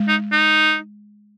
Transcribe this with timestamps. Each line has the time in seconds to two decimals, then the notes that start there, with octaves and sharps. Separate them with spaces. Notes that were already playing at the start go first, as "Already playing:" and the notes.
Already playing: G#3
0.08 D#4
0.32 D#4